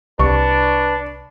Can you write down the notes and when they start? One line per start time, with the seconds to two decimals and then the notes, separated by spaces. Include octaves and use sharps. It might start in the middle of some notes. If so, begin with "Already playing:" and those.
0.19 C2 D4 B4 C#6